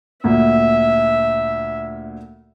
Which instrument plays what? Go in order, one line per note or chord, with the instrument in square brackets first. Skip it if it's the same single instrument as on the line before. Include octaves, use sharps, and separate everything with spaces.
[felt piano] D2 A#2 [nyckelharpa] E5